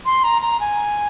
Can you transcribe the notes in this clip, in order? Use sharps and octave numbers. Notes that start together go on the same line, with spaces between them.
C6
A#5
A#5
G#5